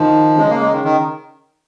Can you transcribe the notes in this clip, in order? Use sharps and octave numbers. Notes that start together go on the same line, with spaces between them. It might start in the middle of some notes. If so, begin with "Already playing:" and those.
Already playing: D#3 F3
C#3 G#3
A#3
G#3
D#3
D#3